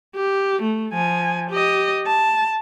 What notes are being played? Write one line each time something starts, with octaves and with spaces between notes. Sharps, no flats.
G4
A3
F3 G#5
G4 D#5
A5